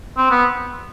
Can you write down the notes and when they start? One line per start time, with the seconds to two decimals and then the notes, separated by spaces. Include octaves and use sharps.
0.17 C4
0.31 B3